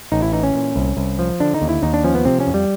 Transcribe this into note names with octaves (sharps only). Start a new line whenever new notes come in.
A1 D#4
E4
E3 D#4
C#4
A#2
C2
C2
F3
D3 D4
D#4
D#2
E4
D#2 D#4
D4
F3 C#4
B3
C3 C4
C#4
F2
G3